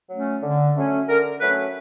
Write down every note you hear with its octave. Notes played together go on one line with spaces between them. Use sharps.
F#3 A3 C#4
D3
F#3 A3 C#4
D3 A#4
F#3 A3 C#4 B4